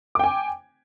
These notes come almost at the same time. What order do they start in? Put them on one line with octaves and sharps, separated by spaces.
D6 G5 G#5